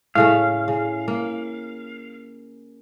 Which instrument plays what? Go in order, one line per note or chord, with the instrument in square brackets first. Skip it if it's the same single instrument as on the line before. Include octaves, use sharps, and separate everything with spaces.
[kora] A2 C#3 A3 [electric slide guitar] F5
[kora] C#3
A#3